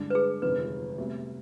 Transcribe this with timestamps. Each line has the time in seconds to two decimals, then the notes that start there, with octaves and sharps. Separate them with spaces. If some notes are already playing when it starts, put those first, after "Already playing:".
Already playing: G2 D3 G#3 D4
0.10 B4
0.15 G#4
0.42 G1 F2 C3 D#3 G#3 B4
0.98 D2 C3 G3 B3